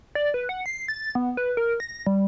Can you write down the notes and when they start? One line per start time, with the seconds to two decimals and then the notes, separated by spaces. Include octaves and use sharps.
0.15 D5
0.34 B4
0.49 F#5
0.66 C7
0.88 A6
1.15 B3
1.37 B4
1.57 A#4
1.80 A#6
2.07 G3